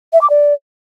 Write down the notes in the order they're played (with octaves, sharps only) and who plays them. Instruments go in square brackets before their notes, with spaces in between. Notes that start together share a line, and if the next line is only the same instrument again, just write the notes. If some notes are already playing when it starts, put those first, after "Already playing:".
[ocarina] E5
D6
D5